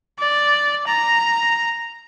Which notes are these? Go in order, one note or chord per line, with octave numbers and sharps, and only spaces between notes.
D5
A#5